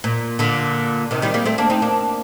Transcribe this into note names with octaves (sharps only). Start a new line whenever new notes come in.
A#2
A#2 D3
C3 D#3
D#3 G3
G3 A#3
A3 C4
A#3 D4
C4 D#4
A#3 D4